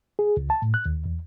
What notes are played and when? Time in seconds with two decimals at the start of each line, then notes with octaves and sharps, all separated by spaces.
0.19 G#4
0.37 C#2
0.50 A5
0.62 A2
0.74 F#6
0.86 D#2
1.06 E2